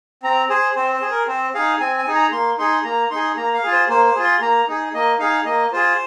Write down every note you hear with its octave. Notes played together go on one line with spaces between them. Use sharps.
C4 A#5
G#4 C5
C4 C5
C5
G#4
A#4
C4 C5
D#4 G#4 F5
C4 G#5
G#5
D#4 G#4
A#5
A#3 C6
D#4 G#4 C6
A#3 A#5
D#4 G#4 C6
A#3 A#5
F5
F4 G#4
C5
A#3 C5
C5
F4 G#4
C6
A#3 A#5
D#4 G#4
A#3 D#5
D#4 G#4 F5
A#3 D#5
F4 G#4 C5